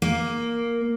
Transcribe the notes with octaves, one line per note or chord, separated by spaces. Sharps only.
A#3